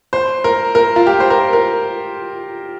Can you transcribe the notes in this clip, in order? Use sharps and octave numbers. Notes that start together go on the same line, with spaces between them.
C5
A#4
A#4
F4
G4
C5
A#4
A#4